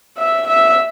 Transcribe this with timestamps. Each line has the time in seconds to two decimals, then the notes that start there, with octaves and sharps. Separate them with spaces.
0.18 E5
0.47 E5